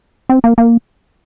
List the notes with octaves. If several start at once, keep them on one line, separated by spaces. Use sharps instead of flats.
C4
A#3
A#3